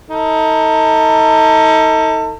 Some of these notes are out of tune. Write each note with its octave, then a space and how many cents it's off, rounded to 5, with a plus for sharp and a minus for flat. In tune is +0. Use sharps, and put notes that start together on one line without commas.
D#4 +35 A4 +35